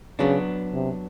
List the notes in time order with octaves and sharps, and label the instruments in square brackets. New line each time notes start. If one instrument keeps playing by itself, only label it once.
[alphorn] C#3 [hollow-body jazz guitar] F#3 B3 D4
[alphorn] C3